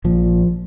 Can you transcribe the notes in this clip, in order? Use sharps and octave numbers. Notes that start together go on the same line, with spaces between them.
A#1 A#2 F3